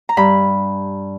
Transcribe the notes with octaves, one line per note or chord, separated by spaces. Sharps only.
A#5
G2 B5